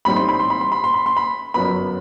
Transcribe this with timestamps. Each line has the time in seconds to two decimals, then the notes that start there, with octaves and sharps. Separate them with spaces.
0.05 A1 A2 G3 C4 D#4 B5
0.16 C6
0.29 B5
0.40 C6
0.50 B5
0.61 C6
0.72 B5
0.84 C6
0.94 B5
1.06 C6
1.17 B5
1.54 G1 F#2 F#3 B3 B5